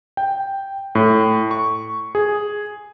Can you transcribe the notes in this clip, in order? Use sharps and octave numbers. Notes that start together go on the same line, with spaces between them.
G5
A2
C#6
G#4